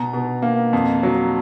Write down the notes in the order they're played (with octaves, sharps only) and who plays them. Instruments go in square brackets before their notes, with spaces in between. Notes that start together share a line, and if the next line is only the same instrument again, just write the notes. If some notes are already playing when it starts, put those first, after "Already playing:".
Already playing: [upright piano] B2 A#5
B2
A#3
F2
F#3